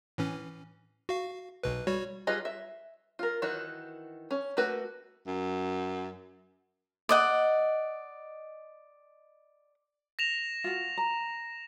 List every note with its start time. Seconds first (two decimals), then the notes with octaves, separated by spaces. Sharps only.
0.18 A2 E3 C#4
1.09 F#4 F5
1.63 B1 B2 B4
1.87 G3 F#4 C#5
2.27 G3 F4 G#4 B4 D#5
2.45 E5
3.19 F4 A#4
3.42 D#3 E3 D#4 F#4
4.31 C#4
4.57 A3 A#3 F#4 B4
5.27 F#2
7.09 D5 D#5 F#5
10.19 A#6 E7 F7
10.64 F4 F#4
10.97 A#5